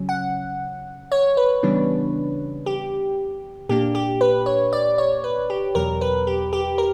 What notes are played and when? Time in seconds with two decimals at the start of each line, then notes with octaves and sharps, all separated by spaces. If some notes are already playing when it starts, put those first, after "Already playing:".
Already playing: C#3 F#3 C#4
0.09 F#5
1.12 C#5
1.37 B4
1.63 C#3 E3 G3 B3 D4
2.66 G4
3.69 A#2 A#3 D4 G4
3.95 G4
4.21 B4
4.46 C#5
4.73 D5
4.98 C#5
5.24 B4
5.50 G4
5.75 E2 B2 F#3 A#4
6.01 B4
6.27 G4
6.53 G4
6.78 A#4